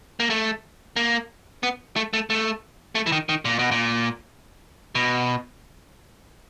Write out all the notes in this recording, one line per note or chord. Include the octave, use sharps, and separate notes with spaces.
A#3
A3
A#3
B3
A3
A3
A3
A3
E3
D#3
D#3
A#2
B2
A#2
B2